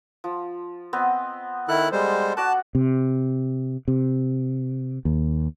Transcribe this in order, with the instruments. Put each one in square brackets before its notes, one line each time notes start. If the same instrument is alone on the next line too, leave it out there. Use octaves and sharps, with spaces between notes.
[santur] F3
B3 C4 D#5
[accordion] D#3 E4 F#6 [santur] A4
[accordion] G3 G#3 C5
[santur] F#4 D5 F#5 [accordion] A5
[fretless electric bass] C3
C3
D#2